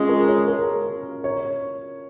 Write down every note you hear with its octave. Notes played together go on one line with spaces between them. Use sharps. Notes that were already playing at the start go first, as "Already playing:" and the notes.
Already playing: G#3 C#4 F4
A#4
C#5
A#4
C#5